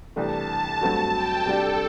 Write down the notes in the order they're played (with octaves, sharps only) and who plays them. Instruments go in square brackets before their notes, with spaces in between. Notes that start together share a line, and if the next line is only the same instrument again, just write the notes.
[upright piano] C2 C3 E3 A3 D4 [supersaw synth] A5
[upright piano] G2 F#3 A3 C4 F#4
[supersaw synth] G5
[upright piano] C3 G3 D4 G4 [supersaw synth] A4